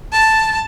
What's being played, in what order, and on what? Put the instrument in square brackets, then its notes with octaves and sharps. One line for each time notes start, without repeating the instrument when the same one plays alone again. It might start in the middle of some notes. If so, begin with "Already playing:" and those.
[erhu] A5